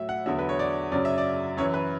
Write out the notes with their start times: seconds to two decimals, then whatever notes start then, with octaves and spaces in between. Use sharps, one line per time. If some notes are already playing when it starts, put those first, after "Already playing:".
Already playing: A2 F#3 E5
0.09 F#5
0.26 E2 D3 F#3 E5
0.39 B4
0.49 C#5
0.59 D5
0.92 F#2 C#3 F#3 D5
1.05 E5
1.18 D5
1.57 F#2 E3 C#5
1.74 B4